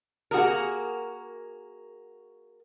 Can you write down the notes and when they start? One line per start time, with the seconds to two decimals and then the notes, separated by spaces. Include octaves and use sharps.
0.31 A#3 F#4 G#4 A#4